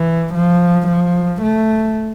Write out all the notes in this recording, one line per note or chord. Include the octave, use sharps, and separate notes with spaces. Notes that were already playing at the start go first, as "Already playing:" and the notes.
Already playing: E3
F3
F3
A3